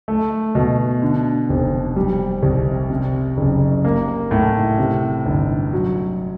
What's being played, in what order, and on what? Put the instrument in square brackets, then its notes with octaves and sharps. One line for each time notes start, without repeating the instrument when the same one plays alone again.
[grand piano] A3
B2
D3
F1
G3
C2
C3
F#1
A#3
A2
C3
G1
F#3